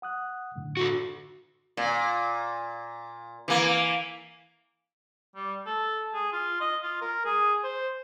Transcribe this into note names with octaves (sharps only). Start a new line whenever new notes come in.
F#5 D#6 F#6
F#2 A2 D3
F#4 G4 A4
A#2
E3 A#3
G3
A4
G#4
F4
D#5
F4
A#4
G#4
C5